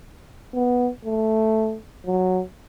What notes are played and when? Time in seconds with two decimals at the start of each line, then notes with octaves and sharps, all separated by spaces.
0.54 B3
1.05 A3
2.06 F#3